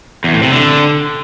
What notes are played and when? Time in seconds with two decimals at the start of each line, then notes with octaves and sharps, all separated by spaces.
0.24 E2
0.33 A2
0.43 C3
0.52 D3